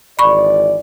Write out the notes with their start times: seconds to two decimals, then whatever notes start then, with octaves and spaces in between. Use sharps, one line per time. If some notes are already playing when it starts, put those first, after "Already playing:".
0.19 G#1 E3 D5 B5 C#6